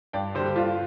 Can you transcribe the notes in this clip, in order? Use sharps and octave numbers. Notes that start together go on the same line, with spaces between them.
G2 D5 G5
D3 G3 G4 C5
G4
G2 F4